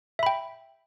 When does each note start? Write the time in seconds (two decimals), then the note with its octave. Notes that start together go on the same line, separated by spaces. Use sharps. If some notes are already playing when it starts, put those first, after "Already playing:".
0.19 E5
0.23 B5
0.26 G5